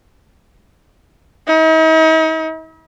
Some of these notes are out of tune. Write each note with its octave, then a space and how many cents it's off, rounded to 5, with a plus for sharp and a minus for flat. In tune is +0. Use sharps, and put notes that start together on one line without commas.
D#4 +45